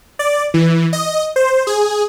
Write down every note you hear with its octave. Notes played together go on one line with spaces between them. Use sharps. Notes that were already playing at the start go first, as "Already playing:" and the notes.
D5
E3
D#5
C5
G#4